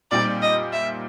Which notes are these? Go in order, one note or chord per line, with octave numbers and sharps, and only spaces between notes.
A#2 G3 C4 D#4 G4 D5
D#5
E5